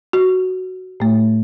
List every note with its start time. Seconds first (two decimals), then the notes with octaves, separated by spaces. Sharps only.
0.13 F#4
1.00 A2 A3